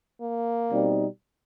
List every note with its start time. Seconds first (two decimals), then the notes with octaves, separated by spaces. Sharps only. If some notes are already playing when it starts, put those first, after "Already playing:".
0.21 A#3
0.71 B2 G3 C4 D#4